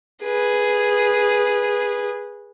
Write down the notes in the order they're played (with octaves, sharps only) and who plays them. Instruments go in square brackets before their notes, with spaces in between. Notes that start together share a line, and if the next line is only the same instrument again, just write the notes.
[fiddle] G#4 B4